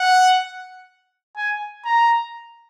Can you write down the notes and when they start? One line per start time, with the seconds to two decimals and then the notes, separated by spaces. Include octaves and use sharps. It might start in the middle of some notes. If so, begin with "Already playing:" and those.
Already playing: F#5
1.36 G#5
1.85 A#5